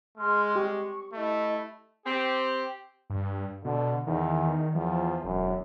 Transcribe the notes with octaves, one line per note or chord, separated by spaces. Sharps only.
G#3 G#4 C6 F6
G4 C#6
A3 E4 D#5
C4 G4
G2
B2 D3
E2 D#3
E2 F3
E1 F#2